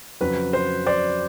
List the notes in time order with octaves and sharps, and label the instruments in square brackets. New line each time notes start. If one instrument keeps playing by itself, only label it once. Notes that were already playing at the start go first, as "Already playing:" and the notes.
[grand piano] F2 C#3 F#3 B4
C5
C5 D5